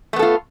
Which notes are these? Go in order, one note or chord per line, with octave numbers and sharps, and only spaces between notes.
A3 B3 F4 A4